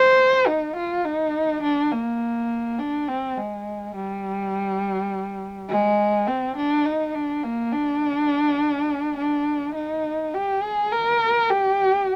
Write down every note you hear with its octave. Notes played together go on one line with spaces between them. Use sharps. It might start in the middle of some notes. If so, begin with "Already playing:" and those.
Already playing: C5
D#4
F4
D#4
D4
A#3
D4
C4
G#3
G3
G#3
C4
D4
D#4
D4
A#3
D4
D4
D#4
G4
G#4
A#4
G4